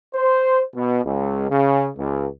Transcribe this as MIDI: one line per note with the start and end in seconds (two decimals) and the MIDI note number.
0.15 0.63 72
0.75 1.00 47
1.05 1.48 37
1.50 1.89 49
1.97 2.27 37